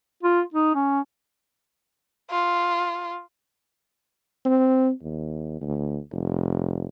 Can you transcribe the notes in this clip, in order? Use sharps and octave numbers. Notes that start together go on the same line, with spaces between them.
F4
D#4
C#4
F4
C4
D#2
D2
F1